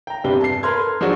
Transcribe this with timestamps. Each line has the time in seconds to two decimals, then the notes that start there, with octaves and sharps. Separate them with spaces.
0.07 G5 A#5
0.24 E2 G2 C3 B4 G7
0.41 A5 C7
0.63 A#4 B4 A#5 C6 F6 G#6
0.80 A4
1.01 F3 F#3 G#3 D4 F#4